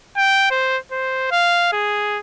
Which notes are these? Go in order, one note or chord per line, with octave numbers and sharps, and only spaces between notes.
G5
C5
C5
F5
G#4